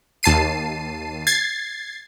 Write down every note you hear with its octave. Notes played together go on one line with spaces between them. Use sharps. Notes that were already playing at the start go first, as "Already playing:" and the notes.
D#2 A5 C7 D#7
G#6 A6 C7